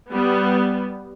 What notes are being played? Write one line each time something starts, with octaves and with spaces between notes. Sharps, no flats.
G3 B3